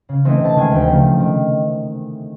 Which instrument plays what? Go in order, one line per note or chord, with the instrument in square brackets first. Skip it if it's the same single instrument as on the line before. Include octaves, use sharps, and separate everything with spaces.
[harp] C#3
E3 A3 C4 D#4
C3 A5
D#3 G#3 G#5
D2 G5
C#3 F3 A3
C3
D#3